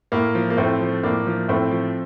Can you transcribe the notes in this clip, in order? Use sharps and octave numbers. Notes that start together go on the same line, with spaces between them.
A2 A#3
F3
A#3
A2 A3 C4
F3
A2 A#3 D4
F3
A2 A3 C4
F3